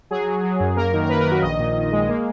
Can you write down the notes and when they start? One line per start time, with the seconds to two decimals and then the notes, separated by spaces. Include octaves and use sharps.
0.11 F#3 G#4
0.27 F#3
0.44 F#3
0.60 F#2
0.77 A#3 A#4
0.94 D#3
1.03 A#4
1.09 A#3 B4
1.21 A#4
1.26 D#3
1.32 F#4
1.42 A#1 D#5
1.59 A#2
1.75 A#2
1.92 G#3
2.09 A#3